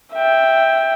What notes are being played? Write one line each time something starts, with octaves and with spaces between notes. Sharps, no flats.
E5 G5